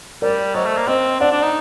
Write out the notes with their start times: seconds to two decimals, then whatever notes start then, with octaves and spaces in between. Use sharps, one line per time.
0.22 G3 A#4 D5
0.55 F#3 C5 D#5
0.66 A3
0.77 A#3
0.88 C4 C5 D#5
1.20 D4 D5 F#5
1.32 D4
1.42 D#4